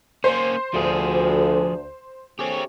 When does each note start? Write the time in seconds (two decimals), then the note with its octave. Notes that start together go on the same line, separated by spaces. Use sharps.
0.24 A#3 C#4 C5
0.74 D2 F3 G#4
2.39 D2 C3 G4 G#4 C#5